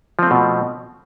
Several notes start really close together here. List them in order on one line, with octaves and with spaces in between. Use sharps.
F3 C4 A3 B2